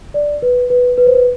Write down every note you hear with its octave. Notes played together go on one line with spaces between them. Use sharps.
D5
B4
B4
B4
C5
B4